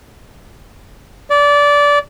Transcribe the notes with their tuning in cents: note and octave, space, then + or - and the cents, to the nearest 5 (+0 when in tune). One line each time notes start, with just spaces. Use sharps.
D5 -20